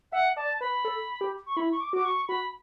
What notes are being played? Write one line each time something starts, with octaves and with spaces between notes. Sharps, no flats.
E5 F#5
D5 A5
B4 B5
A4
G4
C#6
E4 B5
C#6
D6
F#4 D6
C#6
F#4 B5